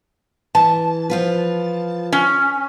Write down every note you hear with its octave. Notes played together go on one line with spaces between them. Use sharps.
E3 A5
F3 F4 B4
C#4